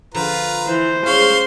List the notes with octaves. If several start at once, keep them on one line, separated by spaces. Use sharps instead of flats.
D3 F3 F4 B4 A#5
E3 C5
C#4 G#4 F5 C6 C#6